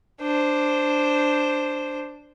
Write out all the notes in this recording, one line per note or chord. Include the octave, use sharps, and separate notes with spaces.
D4 C5